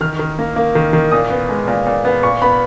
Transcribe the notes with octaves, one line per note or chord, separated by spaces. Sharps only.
D#3 F6
D#3
A#3
A#3
D#3
D#3
A#2 D#6
B3
G#3
A#2
A#2
B3
A#2 C#6
B3 B5